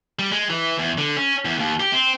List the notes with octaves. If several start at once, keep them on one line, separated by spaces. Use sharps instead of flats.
G3
G#3
E3
E2
D3
C#4
E2
D#2
G4
C4